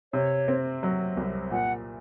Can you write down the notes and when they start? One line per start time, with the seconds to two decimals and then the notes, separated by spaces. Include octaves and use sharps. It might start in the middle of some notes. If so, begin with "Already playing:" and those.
0.13 C3 C#5
0.48 C4
0.83 F#3
1.17 C2
1.51 A#2 F#5